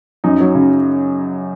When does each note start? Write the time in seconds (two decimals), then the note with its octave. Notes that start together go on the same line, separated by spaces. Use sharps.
0.24 F#2 D#4
0.40 F#3
0.55 C#3